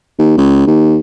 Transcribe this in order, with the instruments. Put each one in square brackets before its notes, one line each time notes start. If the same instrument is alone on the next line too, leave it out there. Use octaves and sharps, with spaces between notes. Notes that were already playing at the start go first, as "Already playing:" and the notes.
[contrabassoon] D#2
C#2
D#2